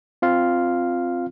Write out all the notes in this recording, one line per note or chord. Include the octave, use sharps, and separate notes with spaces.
C4 F4 F5